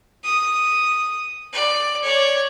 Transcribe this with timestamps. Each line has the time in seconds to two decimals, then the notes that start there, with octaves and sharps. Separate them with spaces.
0.24 D#6
1.53 D5
2.03 C#5 D5